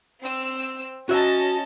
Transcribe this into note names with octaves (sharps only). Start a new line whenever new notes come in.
C4 E6
C#4 F#4 D#5 E5 A5